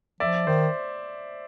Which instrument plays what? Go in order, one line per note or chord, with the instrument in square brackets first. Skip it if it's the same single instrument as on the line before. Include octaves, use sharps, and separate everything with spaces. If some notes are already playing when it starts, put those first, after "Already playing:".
[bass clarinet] F3 [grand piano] D5 E5
[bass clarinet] D#3 [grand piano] C5